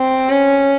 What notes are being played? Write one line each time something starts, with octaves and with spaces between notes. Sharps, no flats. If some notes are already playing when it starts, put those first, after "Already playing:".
Already playing: C4
C#4